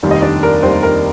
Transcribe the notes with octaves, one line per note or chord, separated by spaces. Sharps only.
F1 D#2 D#3 G3
D#5
D4 D5
A#4
F1 D#2 D#3 G3 C5
A#4